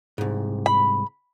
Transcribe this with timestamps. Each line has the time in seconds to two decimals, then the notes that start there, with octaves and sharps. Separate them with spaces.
0.18 C2 G#2
0.66 B5